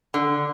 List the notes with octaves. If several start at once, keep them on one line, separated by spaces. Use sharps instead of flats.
D3